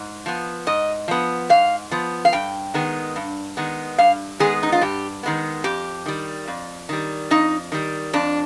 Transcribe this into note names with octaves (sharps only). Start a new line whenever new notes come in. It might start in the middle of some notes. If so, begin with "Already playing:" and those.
Already playing: G#2
F3 B3
G#2 D#5
F3 B3
G#2 F5
F3 B3
F5
G2 G5
D#3 G#3 B3
G2
D#3 G#3 B3
G2 F5
D#3 G#3 B3 G#4
D#4
F4
G2 G4
D#3 G#3 B3
F2 G4
D#3 G3
F2
D#3 G3
F2 D#4
D#3 G3
F2 D4